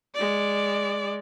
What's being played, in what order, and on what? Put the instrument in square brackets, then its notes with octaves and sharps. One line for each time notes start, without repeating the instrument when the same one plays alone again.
[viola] G#3 D5